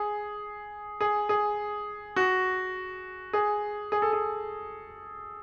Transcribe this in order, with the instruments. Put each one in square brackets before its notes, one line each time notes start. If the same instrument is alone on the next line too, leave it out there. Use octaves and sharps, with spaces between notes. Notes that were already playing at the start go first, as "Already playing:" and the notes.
Already playing: [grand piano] G#4
G#4
G#4
F#4
G#4
G#4
A4
G#4